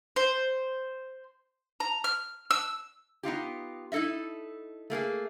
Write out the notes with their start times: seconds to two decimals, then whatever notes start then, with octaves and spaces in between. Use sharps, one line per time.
0.16 C5
1.80 A#5
2.04 F6
2.51 E6
3.23 B3 D#4 F4 G4
3.92 D#4 E4 A4 D#5 E5
4.90 A3 A#3 G4 G#4